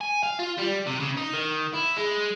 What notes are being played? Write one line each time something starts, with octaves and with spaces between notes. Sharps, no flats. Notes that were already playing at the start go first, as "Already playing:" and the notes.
G#5
F5
F4
G3
C3
C#3
D#4
D#3
E4
G#3